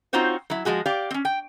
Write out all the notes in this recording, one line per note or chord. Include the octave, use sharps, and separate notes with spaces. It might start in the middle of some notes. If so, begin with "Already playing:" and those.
C4 D#4 F4 F#4 C5 C#5
F#3 E4
F3 G#3 F#4 G#4
G4 D5 F5
C4 C#4
G5